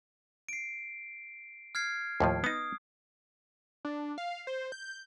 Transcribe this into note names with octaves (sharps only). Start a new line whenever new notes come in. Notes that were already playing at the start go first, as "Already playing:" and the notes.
C7 D7
F6 G#6 C7
D#2 A2 F3
B3 D#4 D#6
D4
F5
C5
G6